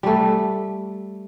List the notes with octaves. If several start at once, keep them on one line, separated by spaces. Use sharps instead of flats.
G3 A3